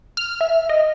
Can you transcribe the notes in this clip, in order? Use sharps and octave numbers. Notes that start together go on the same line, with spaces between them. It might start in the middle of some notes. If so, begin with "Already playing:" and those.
F6
E5
D#5